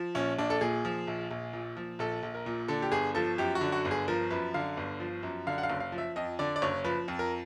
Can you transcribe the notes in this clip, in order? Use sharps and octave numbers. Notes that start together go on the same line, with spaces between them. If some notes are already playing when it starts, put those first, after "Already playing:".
Already playing: F3
A#1 C#4
A#1 D4
A4
A#2 G#4
F3
A#1
A#1
A#2
F3
A#1 A4
A#1
A#4
A#2
D3 A4
G4
G1 G#4
F3 A4
F#2 G4
F#4
D3
F#4
G1
G#4
F3 A#4
F#2 B4
D3 F5
G1
F3
F#2
D3 F5
F#5
F5
F#1
F5
F3
E5
F2 D#5
D3 D5
D5
F#1 C#5
F3 B4
F2
A#4